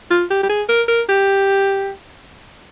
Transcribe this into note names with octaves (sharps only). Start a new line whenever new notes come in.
F4
G4
G4
G#4
A#4
A#4
G4